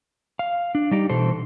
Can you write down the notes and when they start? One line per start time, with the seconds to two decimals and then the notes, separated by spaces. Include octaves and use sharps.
0.39 F5
0.75 D4
0.91 G3 D#4 G4
1.09 B2 E3 A4 C5